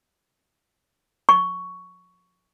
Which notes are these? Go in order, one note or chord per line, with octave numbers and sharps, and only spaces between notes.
C#6